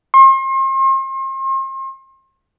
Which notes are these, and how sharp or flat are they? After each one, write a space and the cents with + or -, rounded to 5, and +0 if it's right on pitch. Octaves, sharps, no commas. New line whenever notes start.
C6 +40